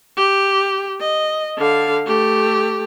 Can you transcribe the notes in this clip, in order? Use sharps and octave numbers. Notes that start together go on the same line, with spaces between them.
G4
D#5
D3 F5
A3 G4